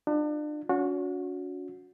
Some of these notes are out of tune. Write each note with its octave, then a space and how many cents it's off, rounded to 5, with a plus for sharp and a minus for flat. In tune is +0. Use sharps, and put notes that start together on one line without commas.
D4 +35 F4 +0
C#4 +40 F#4 -25